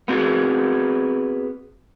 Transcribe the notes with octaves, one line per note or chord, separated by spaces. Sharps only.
B3 C4 F#4 G#4